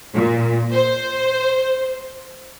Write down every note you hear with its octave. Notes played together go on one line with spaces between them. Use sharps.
A#2
C5